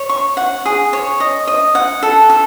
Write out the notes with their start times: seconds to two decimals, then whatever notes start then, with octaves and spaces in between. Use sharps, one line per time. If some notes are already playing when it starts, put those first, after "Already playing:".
Already playing: C#5
0.09 C#6
0.37 F#5
0.66 G#4
0.93 C#5
1.20 D#5
1.47 D#5
1.75 F#5
2.03 A4
2.30 A4